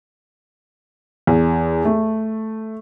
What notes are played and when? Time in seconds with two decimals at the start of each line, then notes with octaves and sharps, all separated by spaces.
1.27 E2
1.85 A3